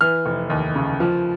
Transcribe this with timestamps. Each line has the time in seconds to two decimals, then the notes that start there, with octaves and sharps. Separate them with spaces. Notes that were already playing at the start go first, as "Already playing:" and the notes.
0.01 E3 F6
0.26 F1
0.50 D#2
0.75 C#3
1.00 F3